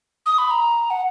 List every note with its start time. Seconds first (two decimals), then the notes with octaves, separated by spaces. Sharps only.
0.26 D#6
0.38 B5
0.51 A#5
0.90 F#5